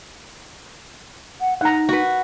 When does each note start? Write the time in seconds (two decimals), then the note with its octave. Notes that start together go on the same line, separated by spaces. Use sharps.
1.41 F#5
1.61 D#4 F#5 A#5
1.89 F#4 B4